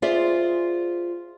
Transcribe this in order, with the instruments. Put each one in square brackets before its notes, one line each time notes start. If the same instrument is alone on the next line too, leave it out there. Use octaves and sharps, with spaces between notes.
[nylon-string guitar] F4 G#4 C5 D5 E5